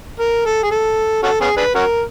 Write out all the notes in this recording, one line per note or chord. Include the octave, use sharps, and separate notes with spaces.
A#4
A4
G#4
A4
C#4 F#4 A4
B3 C#4 G#4
D4 G#4 B4
C#4 F#4 A#4